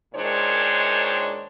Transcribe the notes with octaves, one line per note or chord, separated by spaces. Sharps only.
A#2 D#3 G#3 D4 C5 C#5